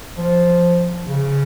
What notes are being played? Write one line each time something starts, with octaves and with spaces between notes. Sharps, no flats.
F3
C#3